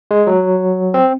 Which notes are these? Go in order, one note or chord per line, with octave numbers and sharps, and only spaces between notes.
G#3
F#3
C4